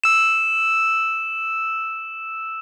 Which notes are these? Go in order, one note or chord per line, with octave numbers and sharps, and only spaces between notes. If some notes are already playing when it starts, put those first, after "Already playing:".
E6 E7